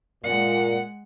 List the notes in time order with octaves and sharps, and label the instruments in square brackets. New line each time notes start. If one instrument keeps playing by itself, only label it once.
[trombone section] A#2 [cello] G#3 F#5